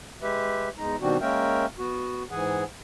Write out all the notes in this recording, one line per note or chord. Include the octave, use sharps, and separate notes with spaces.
G#3 G4 B4 E5
E2 G#3 D#4 A#5
B2 D#3 G3 C4 D4 F#4
G#3 A#3 C#4 A#4 E5 G5
B3 F#4
G#2 E3 G#4 F#5 G#5